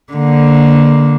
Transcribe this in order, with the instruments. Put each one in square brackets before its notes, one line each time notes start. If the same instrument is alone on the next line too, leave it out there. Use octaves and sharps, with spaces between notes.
[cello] D3 A#3